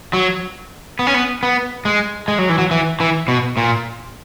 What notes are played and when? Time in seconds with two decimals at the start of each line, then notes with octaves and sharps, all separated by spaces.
0.13 F#3
0.99 B3
1.07 C#4
1.14 B3
1.43 B3
1.85 G#3
2.28 G#3
2.39 F#3
2.49 E3
2.58 F#3
2.71 E3
3.00 E3
3.28 B2
3.57 A#2